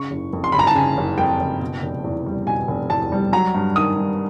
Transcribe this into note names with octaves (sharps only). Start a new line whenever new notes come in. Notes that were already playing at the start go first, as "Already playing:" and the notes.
Already playing: C#3 C#6
F#1
F2
C6
F#1 B5
A#5
A5
C#3 G#5
F#1
F2 G5
F#1
B2
F1
E2
G3
B2 G#5
F1
E2 A5
G3
F#3 A#5
G2
D#3 D#6
G2